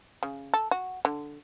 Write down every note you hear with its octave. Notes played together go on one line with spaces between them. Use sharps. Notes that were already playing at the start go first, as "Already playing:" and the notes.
C#3
A4
F#4
D3